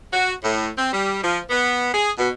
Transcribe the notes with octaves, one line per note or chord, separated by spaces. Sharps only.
F#4
A2
C4
G3
F3
B3
G#4
B2